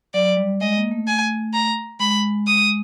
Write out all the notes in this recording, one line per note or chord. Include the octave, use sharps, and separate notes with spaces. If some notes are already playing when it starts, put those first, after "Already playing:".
F#3 D5
G3
G#3 D#5
A#3
A3
G#5
A#5
G#3 B5
D#6